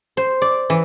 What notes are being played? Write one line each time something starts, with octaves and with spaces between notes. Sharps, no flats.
C5
D5
E3